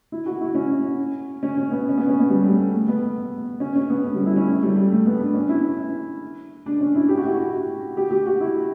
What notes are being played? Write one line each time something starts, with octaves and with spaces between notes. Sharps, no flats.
E4
F#4
E4
C#4
C#4
C#4
B3
C#4
B3
C#4
B3
G3
A3
A3
B3
C#4
C#4
B3
A3
G3
E4
C#4
A3
G3
A3
A3
B3
D4
C#4
E4
D4
C#4
E4
G4
F#4
E4
F#4
G4
G4
F#4
E4